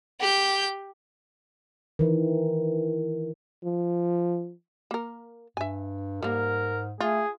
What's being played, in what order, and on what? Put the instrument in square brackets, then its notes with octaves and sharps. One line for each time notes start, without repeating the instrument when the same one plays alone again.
[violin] G4 G6
[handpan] D#3 E3
[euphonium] F3
[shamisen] A#3 A#4
[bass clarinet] G2 [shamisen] E5 G#5
[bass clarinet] G#2 [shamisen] G3 A#3 [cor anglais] A#4
[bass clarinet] A3 [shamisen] F4 [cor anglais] G#4